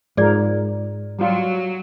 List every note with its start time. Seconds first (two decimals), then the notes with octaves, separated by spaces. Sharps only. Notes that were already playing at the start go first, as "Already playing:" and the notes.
0.17 G#2 F3 G#4 A#4 D5
1.19 F#3 G3 F4